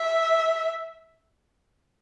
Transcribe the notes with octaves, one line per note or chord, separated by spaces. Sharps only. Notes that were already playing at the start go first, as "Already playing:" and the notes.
Already playing: E5